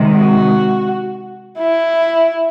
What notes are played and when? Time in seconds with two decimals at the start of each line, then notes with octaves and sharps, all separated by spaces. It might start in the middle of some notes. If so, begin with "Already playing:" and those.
Already playing: C3 D#3 G#3
0.17 F#4
1.58 E4